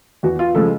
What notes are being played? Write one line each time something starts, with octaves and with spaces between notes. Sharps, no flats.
E2 F#4
F4
C#3 F3 G#3 A4